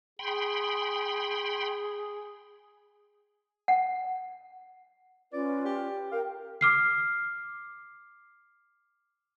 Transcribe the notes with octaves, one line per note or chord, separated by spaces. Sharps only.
G#4 G5 B5 C6
F#5
C#4 F4 B4 D5
G4
A#4 F5 G5
D6 F6 C7